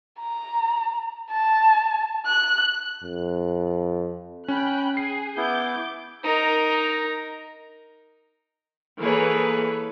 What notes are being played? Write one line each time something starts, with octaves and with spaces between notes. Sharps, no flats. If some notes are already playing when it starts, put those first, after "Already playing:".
A#5
A5
F#6
F2
C#4 G5 B5 F#6
G#4 C7
B3 E4 D6 G6
D#4 A#4
E3 A#3 G#4 A4 B4 C#5